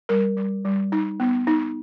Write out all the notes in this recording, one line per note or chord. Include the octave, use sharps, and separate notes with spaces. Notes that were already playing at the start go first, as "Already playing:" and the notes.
G3 A#4
G3
G3
D#4
B3
D#4